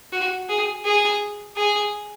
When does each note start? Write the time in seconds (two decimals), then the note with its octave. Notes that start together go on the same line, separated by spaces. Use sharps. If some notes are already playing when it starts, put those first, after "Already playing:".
0.12 F#4
0.49 G#4
0.85 G#4
1.56 G#4